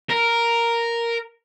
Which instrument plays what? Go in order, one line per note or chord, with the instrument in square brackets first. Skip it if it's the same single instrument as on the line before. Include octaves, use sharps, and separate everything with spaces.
[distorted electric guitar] A#4